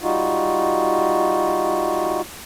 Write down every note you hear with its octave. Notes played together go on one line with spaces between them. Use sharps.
G3 D#4 F4 F#4